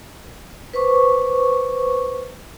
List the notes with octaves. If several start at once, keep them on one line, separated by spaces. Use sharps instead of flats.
B4 C5 C#6 D6